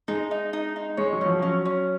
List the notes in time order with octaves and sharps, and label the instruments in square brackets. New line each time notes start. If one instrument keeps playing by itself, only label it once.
[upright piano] G#3 [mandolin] D#4
[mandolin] D#4
D#4
D#4
[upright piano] G#3 [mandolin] C#5
[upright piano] F#3
[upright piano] F3 [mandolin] C#4
[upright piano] F#3 [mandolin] C#4
[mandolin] C#4